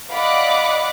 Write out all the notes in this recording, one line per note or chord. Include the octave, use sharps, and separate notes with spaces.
D5 D#5 F5 F#5 B5 D6